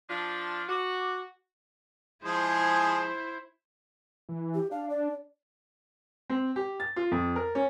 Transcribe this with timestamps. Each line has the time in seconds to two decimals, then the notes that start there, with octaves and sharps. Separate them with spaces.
0.10 F3 D4 F4
0.69 F#4 D6
2.24 F3 G#3 E4 G#4 C5
4.29 E3
4.55 G4
4.71 D4 F5
4.90 D5
6.30 C4
6.56 G4
6.80 A6
6.96 F4
7.12 F2
7.36 A#4
7.55 C#4